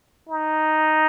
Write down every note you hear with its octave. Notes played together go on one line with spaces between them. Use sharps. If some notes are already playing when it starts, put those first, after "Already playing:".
D#4